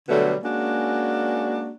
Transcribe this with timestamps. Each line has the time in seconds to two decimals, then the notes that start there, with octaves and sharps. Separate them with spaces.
0.09 B2 D3 F#3 G3 A3
0.43 G#3 A#3 C#4 D4 F#4